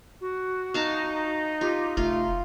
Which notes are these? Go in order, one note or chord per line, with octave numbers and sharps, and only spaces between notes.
F#4
D#4 F5 A5 A#5
F4 G4
F1 A3 F4